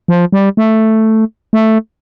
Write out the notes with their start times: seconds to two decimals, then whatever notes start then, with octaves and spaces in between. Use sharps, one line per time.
0.08 F3
0.32 G3
0.57 A3
1.53 A3